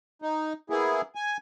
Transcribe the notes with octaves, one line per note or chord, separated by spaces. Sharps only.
D#4
A#3 B3 E4 G#4
G#5